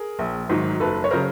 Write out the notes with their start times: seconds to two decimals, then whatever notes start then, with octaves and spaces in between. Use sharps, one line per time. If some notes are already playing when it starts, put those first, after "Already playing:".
Already playing: G#4 A#4
0.19 A#1
0.49 G#2 D#3 F#3
0.80 F#1 A4 B4
1.04 C#5
1.11 C#3 F#3 A#4 C5